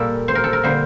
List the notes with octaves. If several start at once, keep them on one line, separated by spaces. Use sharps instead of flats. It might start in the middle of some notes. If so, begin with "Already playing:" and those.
Already playing: A#2 G3 A#3 A4
C5
A#4
A4
A#4
D3 G3 A#3 C5